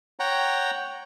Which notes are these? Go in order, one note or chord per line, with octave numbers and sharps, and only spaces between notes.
C#5 F#5 G5 A#5